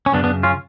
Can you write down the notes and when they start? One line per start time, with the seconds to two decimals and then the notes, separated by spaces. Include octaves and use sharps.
0.06 C#4
0.14 F#2 C#3 B3 D4
0.24 B3 D4
0.43 C#4 F4